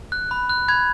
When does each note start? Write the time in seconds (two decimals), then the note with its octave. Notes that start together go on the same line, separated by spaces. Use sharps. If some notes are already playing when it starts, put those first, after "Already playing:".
0.12 F#6
0.31 B5
0.49 F#6
0.68 B5 G#6